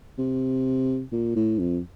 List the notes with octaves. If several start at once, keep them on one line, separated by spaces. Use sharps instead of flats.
C3
A#2
A2
F2